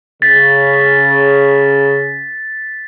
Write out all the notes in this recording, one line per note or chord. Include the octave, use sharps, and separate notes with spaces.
C#3 A6 B6